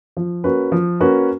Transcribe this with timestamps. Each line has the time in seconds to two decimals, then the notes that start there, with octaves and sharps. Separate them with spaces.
0.17 F3
0.44 A#3 C#4 F#4 B4
0.72 F3
1.00 A#3 C#4 F#4 B4